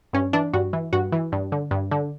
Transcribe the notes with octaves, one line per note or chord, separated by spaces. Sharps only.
G2 C#4
E3 D4
G2 F#4
E3
G2 F#4
E3
G2
D3
G2
D3